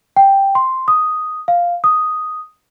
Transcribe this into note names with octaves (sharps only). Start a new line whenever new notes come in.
G5
C6
D#6
F5
D#6